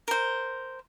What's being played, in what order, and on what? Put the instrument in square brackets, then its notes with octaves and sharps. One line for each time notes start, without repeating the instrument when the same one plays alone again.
[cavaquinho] A#4 C5